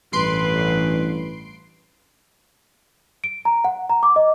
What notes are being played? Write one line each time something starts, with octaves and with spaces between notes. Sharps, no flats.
A1 G2 B4 C6 C7 D7
D7
A#5
F#5
A#5
D6
D#5